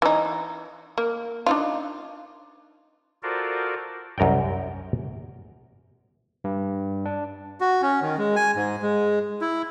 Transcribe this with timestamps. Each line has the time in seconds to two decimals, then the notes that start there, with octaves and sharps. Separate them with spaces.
0.02 E3 D#4
0.98 A#3
1.46 D4 D#4 F4
3.23 F4 F#4 A4 A#4 C5 D5
4.18 C2 F#2 A#4 D5 G5
6.44 G2
7.05 D4
7.61 F#4
7.82 C#4
8.02 D#3
8.18 G#3
8.36 G#5
8.56 G#2
8.82 G#3
9.41 E4